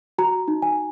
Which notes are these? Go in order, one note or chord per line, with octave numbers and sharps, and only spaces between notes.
F#4 A#5
D#4
G#5